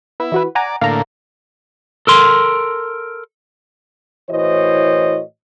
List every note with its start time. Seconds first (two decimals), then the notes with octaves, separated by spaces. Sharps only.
0.20 B3 E4
0.32 E3 F#4 B4
0.55 D5 F#5 G#5 A#5
0.81 A2 D3 A#3 F5 A#5
2.07 A4 A#4 C6
4.30 A2 E3 F#4 C5 C#5 D#5